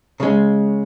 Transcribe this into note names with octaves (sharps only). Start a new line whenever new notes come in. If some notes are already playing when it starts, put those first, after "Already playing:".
C#3 G#3